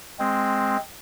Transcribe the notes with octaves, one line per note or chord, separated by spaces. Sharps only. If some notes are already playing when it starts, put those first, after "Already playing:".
G#3 C4